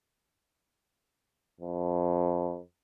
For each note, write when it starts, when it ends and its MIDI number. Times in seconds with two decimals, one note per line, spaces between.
1.61 2.59 41